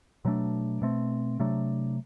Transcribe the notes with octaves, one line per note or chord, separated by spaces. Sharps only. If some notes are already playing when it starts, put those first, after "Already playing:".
B2 F#3 A3 D4
B2 A3 C4
C3 F#3 A3 D4